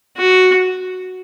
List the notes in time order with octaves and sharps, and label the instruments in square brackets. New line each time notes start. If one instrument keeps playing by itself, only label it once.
[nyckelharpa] F#4